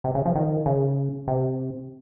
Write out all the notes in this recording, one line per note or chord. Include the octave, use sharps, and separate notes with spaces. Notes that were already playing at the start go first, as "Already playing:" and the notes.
C3
C#3
F3
D#3
C#3
C3